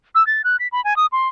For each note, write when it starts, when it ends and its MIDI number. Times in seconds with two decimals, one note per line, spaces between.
0.15 0.25 88
0.27 0.42 93
0.44 0.56 90
0.60 0.68 95
0.72 0.83 83
0.84 0.96 80
0.96 1.06 87
1.12 1.28 84